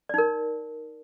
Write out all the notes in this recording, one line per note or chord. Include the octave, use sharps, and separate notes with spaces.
D#4 A#4 D5